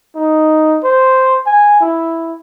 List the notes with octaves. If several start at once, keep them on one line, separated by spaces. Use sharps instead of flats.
D#4
C5
G#5
E4